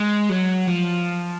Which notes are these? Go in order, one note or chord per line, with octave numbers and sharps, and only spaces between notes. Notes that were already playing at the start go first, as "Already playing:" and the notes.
Already playing: G#3
F#3
F3